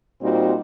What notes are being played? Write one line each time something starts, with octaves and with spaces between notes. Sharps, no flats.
A#2 G3 C4 D#4 F#4